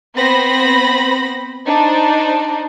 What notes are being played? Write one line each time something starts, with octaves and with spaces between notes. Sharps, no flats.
B3 C4 C5 B5 A#6
D4 D#4 C5